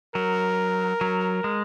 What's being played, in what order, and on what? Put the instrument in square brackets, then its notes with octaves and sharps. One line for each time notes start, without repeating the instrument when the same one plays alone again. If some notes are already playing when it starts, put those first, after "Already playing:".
[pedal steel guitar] F#3 [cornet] A#4
[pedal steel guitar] F#3
G#3